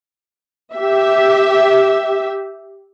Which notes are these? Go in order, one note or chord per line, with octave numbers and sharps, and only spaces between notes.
G4 E5